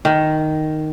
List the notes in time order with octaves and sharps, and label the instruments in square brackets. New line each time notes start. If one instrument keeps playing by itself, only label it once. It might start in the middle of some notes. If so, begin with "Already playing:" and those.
[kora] D#3